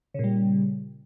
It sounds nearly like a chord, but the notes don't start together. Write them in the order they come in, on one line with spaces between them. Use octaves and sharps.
C#3 A#2 G3